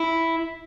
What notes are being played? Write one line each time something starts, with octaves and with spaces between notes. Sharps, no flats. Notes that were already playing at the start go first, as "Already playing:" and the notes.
Already playing: E4